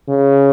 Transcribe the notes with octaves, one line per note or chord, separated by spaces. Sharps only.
C#3